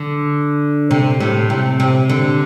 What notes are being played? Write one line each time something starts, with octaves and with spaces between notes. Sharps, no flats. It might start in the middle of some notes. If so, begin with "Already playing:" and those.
Already playing: D3
C3
A2
C3
C3
D3